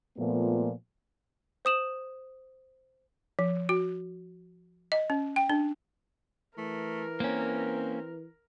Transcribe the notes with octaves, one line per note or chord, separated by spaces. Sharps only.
A#2 F3 A3 B3
C5 D#6 E7 F#7
F3
F#4
D#5
C#4
G5
D4
E3 A3 A#4
A#3 C4 C#4